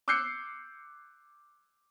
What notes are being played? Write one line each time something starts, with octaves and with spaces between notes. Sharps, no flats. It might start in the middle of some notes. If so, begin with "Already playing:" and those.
D6 E6 F#6 G6 C7 C#7